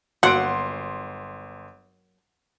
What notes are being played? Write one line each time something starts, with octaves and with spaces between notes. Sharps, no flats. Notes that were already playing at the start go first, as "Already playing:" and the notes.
G1 F#3 A#3 F#5 C6 D7